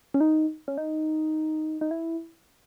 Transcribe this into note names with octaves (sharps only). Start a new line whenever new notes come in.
C#4
D#4
C#4
D#4
D#4
E4